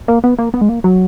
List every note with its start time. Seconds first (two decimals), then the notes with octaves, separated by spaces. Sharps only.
0.08 A#3
0.24 B3
0.39 A#3
0.54 B3
0.61 G#3
0.69 A#3
0.84 F#3